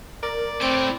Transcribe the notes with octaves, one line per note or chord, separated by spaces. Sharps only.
A#4 D5
A2 C4 D7